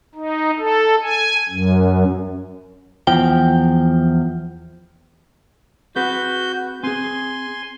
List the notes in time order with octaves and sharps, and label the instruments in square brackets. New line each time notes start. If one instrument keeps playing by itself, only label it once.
[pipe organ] D#4
A4
G#5
F#2
[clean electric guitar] E2 F3 G5
[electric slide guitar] C4 G#4 B4 [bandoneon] F#4 G6
[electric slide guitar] C4 G#4 [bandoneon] G#5 C6